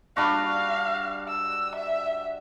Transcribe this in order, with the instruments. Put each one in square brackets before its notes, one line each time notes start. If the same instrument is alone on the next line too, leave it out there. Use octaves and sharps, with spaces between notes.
[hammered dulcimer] G3 D4 F#4 [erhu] F5
[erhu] E6
E5